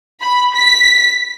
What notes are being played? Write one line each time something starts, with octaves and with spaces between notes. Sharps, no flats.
B5
B6